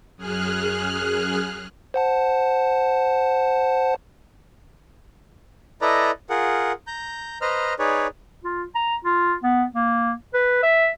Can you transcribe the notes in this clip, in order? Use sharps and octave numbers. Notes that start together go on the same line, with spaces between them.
F#2 G#4 F6 F#6
C5 F#5 A5
E4 A4 B4 D5 D#5 A#5
F4 G#4 A#4 F#5
A#5 G6
B4 C5 D#5 A#5 F6
D#4 G#4 B4 C#5 D5
F4
A#5
F4
B3
A#3
B4
E5